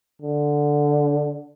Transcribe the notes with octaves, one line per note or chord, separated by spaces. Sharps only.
D3